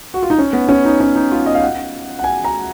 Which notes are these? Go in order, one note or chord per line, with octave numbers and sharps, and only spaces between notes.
F#4
F4
D#4
C#4
B3
C#4
D#4
C#4
D#4
F4
D#5
F5
F#5
F#5
G#5
A#5